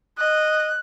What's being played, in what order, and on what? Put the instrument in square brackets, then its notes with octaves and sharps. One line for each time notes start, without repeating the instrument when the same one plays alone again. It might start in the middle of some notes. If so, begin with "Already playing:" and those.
[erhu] D#5 [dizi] F#6